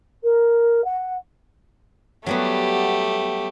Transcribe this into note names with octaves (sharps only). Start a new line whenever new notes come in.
A#4
F#5
F#3 G3 A3 B3 G4